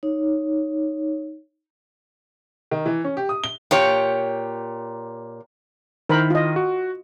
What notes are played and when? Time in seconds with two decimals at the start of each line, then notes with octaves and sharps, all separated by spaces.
0.03 D#4 C#5
2.71 D#3
2.86 E3
3.04 C#4
3.17 G4
3.29 D#6
3.44 G7
3.71 A#2 G4 C#5
6.09 D#3 E4 A#4 C5 B5
6.30 F4 D#5
6.56 F#4